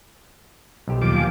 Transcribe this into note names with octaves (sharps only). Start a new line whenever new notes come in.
B1 G4 C5
D#2 F3 D6
F5 G#5 A5